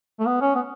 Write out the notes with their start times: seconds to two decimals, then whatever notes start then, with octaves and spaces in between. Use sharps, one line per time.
0.20 A3
0.27 B3
0.41 C#4
0.55 B3